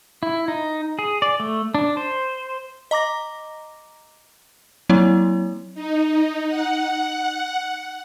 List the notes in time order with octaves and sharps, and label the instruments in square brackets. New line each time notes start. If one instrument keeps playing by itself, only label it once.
[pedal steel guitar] E4
D#4
G#4
D5
A3
D4
C5
[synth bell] D#5 A#5 D6 A#6
F#3 A#3 C4 E4 C#5
[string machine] D#4
F#5